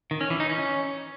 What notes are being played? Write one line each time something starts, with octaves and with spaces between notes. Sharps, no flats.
D#3
C#4
E3
D#4
C#4